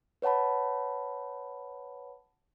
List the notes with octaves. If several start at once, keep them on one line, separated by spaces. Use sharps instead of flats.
B4 C#5 F#5 A5 B5